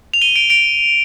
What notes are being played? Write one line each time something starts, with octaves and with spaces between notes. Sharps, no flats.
F7
D#7 G7
D7 F7
D7 F7